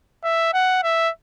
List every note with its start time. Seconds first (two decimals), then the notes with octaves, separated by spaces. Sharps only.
0.23 E5
0.53 F#5
0.83 E5